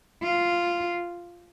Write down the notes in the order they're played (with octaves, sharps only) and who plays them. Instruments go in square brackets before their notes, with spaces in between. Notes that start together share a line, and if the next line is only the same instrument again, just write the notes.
[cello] F4